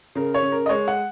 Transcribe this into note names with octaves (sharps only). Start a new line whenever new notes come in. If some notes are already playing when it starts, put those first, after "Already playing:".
C#3 A#4
C#5
C#3
A#4
D#5
G#3 C#5
F#5